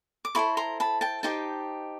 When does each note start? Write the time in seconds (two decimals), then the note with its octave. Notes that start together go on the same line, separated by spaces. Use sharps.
0.25 D6
0.35 E4 A4 C5 B5 C#6
0.57 A#5 C6
0.80 A5 B5
1.01 G5 A5
1.23 D#4 G4 C5 G5 A5